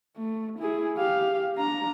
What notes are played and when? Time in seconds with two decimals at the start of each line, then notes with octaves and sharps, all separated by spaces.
0.17 A3
0.59 E4 G#4
0.98 G4 F5
1.56 D4 A#5